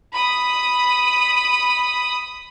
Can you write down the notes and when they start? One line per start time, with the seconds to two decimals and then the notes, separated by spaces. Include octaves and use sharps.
0.13 B5 D#6